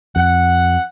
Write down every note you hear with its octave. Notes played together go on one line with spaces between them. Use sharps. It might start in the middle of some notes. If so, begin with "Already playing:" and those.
F2 F#5